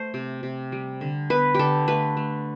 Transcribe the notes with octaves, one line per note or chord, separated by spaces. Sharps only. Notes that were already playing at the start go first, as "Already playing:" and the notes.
Already playing: A3 C5
C3
C3
G3
D3
B3 B4
D3 G4 A4
A3 B4
A3